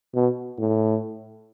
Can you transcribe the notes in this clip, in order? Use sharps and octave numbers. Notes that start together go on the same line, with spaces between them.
B2
A2